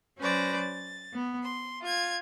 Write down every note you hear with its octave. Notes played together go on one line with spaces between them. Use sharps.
F#3 C#4 B4 C5 D5 A#6
A6
B3
C6
F4 G#6